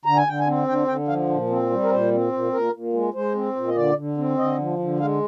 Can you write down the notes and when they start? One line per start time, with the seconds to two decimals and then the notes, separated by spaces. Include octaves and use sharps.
0.05 D3 A#5
0.17 G#5
0.27 D3 G5
0.40 G#5
0.47 C4
0.67 D3 G5
0.87 D3 G5
1.08 F3 F5
1.29 A#2
1.50 C4
1.70 G3
1.83 A#4
1.91 A#2 C5
2.12 C4
2.32 A#2
2.52 A#2 A#4
2.73 A#2
2.93 G#3
3.14 G#3 C5
3.35 C4
3.56 A#2
3.68 D#5
3.76 D3 D5
3.96 D3
4.17 C4
4.38 D3 D#5
4.59 F3
4.79 D3
5.00 G#3 F5